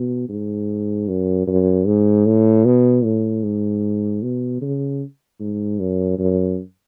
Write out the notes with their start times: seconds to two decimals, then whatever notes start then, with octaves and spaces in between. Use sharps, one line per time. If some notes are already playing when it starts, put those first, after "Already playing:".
Already playing: B2
0.29 G#2
1.08 F#2
1.47 F#2
1.86 G#2
2.26 A2
2.65 B2
3.04 A2
3.44 G#2
4.22 B2
4.61 C#3
5.40 G#2
5.79 F#2
6.18 F#2